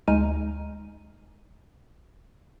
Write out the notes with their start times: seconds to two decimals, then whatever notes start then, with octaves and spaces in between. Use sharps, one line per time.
0.08 D2 G#3 D#4 G#5 F6 D#7